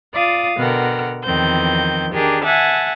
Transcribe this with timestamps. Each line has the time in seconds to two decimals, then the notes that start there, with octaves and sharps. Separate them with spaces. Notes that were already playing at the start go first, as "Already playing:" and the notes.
0.15 F4 D5 F5 D#6
0.57 B2 D3 A#4 F#5 G5 F6
1.24 E2 D#3 F3 C4 G6
2.13 D#3 D4 G4 G#4 A#4
2.43 E5 F#5 G#5 A5